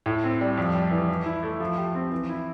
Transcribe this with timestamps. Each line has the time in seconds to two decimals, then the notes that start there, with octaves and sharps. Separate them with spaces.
0.06 A2
0.24 C4
0.41 G3
0.57 F2
0.75 G3
0.91 E3
1.09 E3
1.26 E4
1.43 A3
1.60 F3
1.78 G4
1.95 C4
2.12 E3
2.29 E4